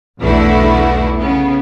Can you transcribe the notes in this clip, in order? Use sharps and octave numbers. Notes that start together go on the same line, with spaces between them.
B1 E2 D3 A3 E4 F#4
C#3 B3